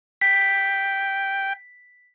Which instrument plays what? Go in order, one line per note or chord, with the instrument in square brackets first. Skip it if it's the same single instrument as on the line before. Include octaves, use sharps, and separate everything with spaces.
[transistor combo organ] G5 [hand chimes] B6